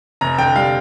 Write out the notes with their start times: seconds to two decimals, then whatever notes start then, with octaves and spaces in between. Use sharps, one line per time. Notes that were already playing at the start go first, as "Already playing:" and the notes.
0.21 F1 A#5
0.39 D3 G5
0.55 G3 F5